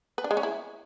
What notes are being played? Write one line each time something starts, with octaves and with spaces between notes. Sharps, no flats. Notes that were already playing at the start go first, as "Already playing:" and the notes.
B4
D4
G#3
C#4
E4